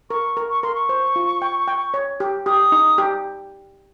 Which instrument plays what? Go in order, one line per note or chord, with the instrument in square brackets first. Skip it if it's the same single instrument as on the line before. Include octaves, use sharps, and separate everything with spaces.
[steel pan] A#4 [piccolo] C#6
[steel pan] A#4
[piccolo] C#6
[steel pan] A#4 [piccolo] C6
[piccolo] C#6
[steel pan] C5
F4
G5
G5
C#5
G4
[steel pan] G4 [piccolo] D#6
[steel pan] D#4
G4